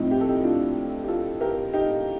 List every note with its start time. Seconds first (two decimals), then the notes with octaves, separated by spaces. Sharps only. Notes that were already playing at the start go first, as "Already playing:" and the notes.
Already playing: A2 F3 C4 D#4
0.11 G4
0.21 A4
0.29 D#4 G4
0.43 D4 F4
1.04 G4
1.08 F4 A4
1.40 G4 A#4
1.73 D#4 G4